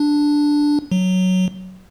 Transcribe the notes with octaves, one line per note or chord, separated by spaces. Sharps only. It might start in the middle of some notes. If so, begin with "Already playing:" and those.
Already playing: D4
F#3